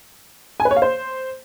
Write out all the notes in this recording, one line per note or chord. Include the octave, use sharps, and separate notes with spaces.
G#5
B4
C#5
F5
C5